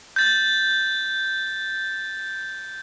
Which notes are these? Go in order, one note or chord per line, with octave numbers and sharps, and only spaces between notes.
G6 A6